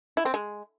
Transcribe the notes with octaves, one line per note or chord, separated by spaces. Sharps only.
E4
C4
G#3